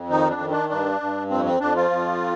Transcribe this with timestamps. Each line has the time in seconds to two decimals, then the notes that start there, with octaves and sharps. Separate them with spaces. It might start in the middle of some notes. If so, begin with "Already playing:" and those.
Already playing: F2
0.09 D#3 D#4
0.30 D4
0.40 D#3
0.50 D4
0.69 G2 D4
1.01 G2
1.30 F2 C4
1.45 C4
1.60 F2 D4
1.76 F3 F4
1.90 F2